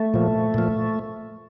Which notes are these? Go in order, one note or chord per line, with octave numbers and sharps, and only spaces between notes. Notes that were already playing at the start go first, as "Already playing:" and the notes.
Already playing: A3
A#2 F3
A#2 F3